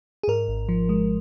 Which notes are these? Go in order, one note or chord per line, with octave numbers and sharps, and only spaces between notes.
G#4
G#2 A#4
G#1
F3
G#3